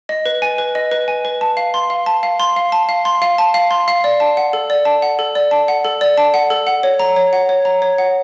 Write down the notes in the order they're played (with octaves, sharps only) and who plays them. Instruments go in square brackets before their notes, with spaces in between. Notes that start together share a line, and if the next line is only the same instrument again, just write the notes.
[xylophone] D#5
B4
G#5
B4
D#5
B4
G#5
B4
A5
F5
C6
F5
A5
F5
C6
F5
A5
F5
C6
F5
A5
F5
C6
F5
D5
A5
F#5
A4
D5
A5
F#5
A4
D5
A5
F#5
A4
D5
A5
F#5
A4
F#5
C#5
A#5
C#5
F#5
C#5
A#5
C#5
F#5